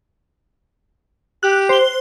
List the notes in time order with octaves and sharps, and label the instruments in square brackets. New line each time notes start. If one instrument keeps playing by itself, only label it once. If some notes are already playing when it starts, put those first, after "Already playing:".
[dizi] G4 [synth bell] F#6
[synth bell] C5 G7